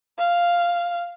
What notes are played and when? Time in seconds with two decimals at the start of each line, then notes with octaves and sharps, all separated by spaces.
0.18 F5